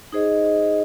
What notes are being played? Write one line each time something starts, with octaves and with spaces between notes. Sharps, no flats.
D#4 G#4 C5 D#5